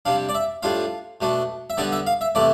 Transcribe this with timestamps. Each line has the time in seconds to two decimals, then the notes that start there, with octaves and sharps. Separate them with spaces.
0.05 C3 G3 D4 F5
0.29 D5
0.35 E5
0.63 A2 G3 D4 F4 F5
1.21 B2 A3 D4
1.70 E5
1.77 D3 G3 B3 D5
1.92 E5
2.07 F5
2.21 E5
2.35 C3 E3 A3 D5